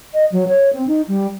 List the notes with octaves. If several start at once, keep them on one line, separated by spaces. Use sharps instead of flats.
D#5
F#3
C#5
C4
D#4
G3